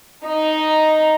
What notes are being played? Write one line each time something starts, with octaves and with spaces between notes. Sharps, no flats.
D#4